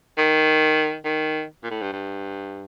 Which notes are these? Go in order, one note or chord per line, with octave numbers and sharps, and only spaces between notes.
D#3
D#3
A#2
A2
G2
G2